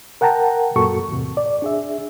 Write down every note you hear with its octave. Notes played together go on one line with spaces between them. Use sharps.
A#4 F#5 G5 A5 A#5
F#2 A#2 F#4 A4 C#6
E2 A2 C3
D5
D4 G#4 E5